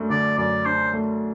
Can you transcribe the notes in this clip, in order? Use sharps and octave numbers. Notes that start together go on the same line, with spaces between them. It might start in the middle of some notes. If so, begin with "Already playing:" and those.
Already playing: F#2 A3 D4
D3 D5
F#2 D5
D4 C5
A3